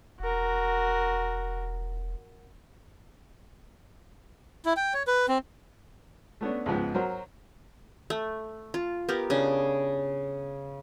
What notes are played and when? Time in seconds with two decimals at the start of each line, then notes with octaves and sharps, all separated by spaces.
0.20 E1 F#4 A#4
4.65 E4
4.77 G5
4.94 C#5
5.07 B4
5.28 C4
6.41 A3 B3 C#4 D4
6.66 C#2 G#2 F3 B3
6.94 F#3 F#4 A#4 C5
8.10 A3
8.74 F4
9.09 B3 G4 A#4
9.30 C#3 D4